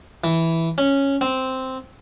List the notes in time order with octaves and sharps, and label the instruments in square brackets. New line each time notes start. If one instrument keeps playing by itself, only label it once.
[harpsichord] E3
C#4
C4